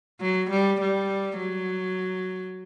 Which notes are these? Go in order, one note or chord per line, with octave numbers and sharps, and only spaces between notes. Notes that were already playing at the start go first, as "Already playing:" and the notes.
F#3
G3
G3
F#3